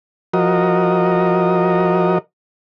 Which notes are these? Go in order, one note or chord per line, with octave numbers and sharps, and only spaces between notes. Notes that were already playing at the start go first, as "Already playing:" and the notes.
F3 F#4 A#4 D#5